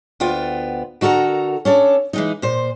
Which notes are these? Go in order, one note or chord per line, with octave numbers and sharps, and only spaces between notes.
D2 B3 F4 G5
D3 F#4 A4 A#4 A#5
C#4 D4 A4
E3 G#3 D#4
A#2 C5